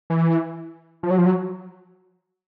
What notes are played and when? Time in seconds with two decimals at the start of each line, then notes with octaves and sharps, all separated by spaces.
0.10 E3
1.03 F3
1.10 F#3
1.18 F3
1.26 F#3